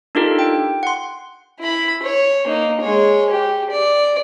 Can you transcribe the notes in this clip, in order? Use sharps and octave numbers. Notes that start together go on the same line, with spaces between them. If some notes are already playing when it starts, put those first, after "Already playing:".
D4 D#4 F4 G4 A4 A#4
G5
F#5 C6
E4 B5
C#5
A#3 D#4
G#3 C#5
G4
D5